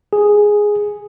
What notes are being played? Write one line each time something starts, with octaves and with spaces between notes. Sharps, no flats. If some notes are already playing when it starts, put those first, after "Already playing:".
G#4